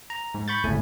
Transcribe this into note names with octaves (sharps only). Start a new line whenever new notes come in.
A#5
G#2
B5 C#6 G6 A6
G1 C#2 A2 A3 G#5